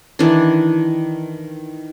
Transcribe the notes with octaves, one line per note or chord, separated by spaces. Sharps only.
D#3 E3 D4